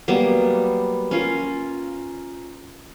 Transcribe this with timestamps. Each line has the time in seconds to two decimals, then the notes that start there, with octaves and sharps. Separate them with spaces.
0.08 F#3 G3 A#3 B3
1.11 C#4 F4 A#4